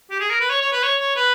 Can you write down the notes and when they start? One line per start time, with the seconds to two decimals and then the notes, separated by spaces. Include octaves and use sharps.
0.10 G4
0.20 G#4
0.30 A#4
0.40 B4
0.50 C#5
0.61 C#5
0.73 B4
0.83 C#5
1.00 C#5
1.16 B4